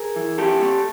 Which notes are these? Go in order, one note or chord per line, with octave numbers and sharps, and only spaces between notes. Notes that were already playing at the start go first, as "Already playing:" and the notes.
Already playing: G#4 A#4
E3
A3 G4 A4
A3